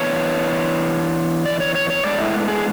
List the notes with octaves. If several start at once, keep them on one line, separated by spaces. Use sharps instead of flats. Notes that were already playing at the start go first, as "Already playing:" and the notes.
Already playing: E3 B3 D4 C#5
D5
C#5
C#5
C#5
A2 G#3 B3 D4 D5
E4
G#4